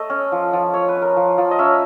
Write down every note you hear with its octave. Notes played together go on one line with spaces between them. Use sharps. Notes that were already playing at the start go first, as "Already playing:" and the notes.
Already playing: A3 D#5
C#4
F3
F3
A3 C#5
B4
C#4
A#4
F3
F3
D#5
C#4 E5